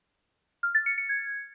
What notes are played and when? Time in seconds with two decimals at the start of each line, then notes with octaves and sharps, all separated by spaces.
0.63 F6
0.75 A6
0.86 C#7
0.98 C#7
1.09 G#6